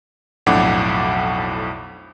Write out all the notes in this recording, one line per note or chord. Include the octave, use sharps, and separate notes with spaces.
B1 F2 A2 D4 F#5 D6